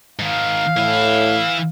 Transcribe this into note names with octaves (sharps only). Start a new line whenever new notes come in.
G#2 D#3 F5
A2 E3 E4